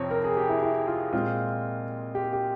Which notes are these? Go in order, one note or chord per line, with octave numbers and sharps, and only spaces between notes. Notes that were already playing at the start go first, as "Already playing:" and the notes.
Already playing: F2 C3 F3 C4 C#5
A#4
G#4
G4
E4
E4
F4
A#2 G#3 C4 F4
G4
G4